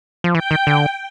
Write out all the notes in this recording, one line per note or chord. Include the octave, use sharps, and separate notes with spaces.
F3
E3 G5
D#3
D3